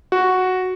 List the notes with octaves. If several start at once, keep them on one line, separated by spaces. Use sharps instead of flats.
F#4